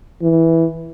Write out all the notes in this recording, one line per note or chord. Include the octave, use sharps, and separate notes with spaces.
E3